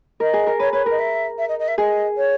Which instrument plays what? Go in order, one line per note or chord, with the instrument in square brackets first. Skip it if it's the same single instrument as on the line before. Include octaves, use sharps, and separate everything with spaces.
[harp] A#4 [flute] D#5
[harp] G#4
A#4
[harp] B4 [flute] C#5
[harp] B4 [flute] C#5
[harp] A#4 [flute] D#5
[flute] E5
E5
D#5
D#5
E5
[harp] G#4 [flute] D#5
[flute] C#5